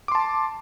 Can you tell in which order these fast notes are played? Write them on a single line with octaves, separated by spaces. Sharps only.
D6 C6 A5